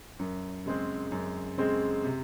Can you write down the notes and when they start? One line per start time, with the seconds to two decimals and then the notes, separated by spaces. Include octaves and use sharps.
0.19 F#2
0.66 C#3 G#3 C4
1.12 F#2
1.58 C#3 G#3 C4
2.04 C3